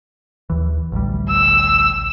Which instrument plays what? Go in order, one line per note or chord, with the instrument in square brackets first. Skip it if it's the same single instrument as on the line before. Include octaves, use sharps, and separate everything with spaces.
[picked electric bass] D#2 E3
A1 D2 G3
[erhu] E6